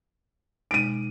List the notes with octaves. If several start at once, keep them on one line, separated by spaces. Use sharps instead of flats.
B2 G#3 D#4 D7 D#7